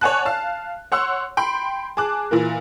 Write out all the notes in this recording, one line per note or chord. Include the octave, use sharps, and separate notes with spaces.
C#5 D5 F#5 G#5 A5 F#6
F5 A5
C#5 F#5 C6 E6
G5 B5 C6
G#4 A5 D6 F#6
A#2 E3 A#4